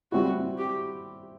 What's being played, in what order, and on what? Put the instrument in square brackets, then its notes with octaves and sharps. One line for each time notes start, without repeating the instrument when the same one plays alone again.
[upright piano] G3 C4 E4 [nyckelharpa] F#4
[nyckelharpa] G4